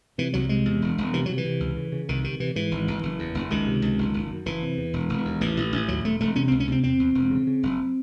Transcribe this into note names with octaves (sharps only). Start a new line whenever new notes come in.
C3 E3
C2 F#3
C3 G#3
E2
E1
E1
C3 E3
C3 F#3
E3
C3
C#2
C#3
C#3
C2 D#3
C3 D#3
C3 E3
G#2 E3
G#1
G#1
F#1
E2
F#1
C#2 D#3
C3
C#2
F#1
F#1
F#2
F#1 E3
C3
E2
E1
E1
D#2
A1 E3
A1
A1
D#2 F#3
E1 A3
E1 A3
C3 C#4
C#2 C4
C#4
C3 C4
E2 C4
E2
E1
C#3
C#3
F#1